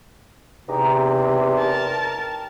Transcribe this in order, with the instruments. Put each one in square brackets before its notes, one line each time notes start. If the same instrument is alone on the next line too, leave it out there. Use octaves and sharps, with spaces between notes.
[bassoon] E2 [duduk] C3 [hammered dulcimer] D#4 G4 G#4
[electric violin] A#4 A5